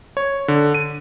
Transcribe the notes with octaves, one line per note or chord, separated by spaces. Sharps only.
C#5
D3
D#7